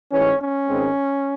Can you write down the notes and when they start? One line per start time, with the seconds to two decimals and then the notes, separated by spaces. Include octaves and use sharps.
0.12 A1 G#2 E3 G#3 C#4
0.40 C#4
0.68 G#1 G#2 D#3 G#3 C4